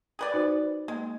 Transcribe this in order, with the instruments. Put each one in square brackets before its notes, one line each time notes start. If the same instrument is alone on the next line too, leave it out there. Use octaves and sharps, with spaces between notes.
[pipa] G#4 B4 D5
[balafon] D#4 F#4 C5
[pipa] G#3 [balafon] A#3